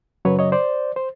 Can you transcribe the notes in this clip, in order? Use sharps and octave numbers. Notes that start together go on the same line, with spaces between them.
F#2 C#3 F#3 B4 C#5
C#5 D#5
C5 D5
C5